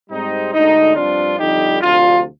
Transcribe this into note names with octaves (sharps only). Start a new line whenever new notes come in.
G#2 G3 C4 D#4
D2 D3 G#3 D4 D#4
G2 F3 C4 D4 F4
F2 D3 G3 D#4 G4
D2 C3 F3 D4 F4